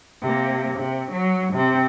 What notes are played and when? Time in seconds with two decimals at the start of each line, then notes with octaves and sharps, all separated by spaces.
0.22 C3 A#3
0.78 C3
1.12 F#3
1.54 C3 C4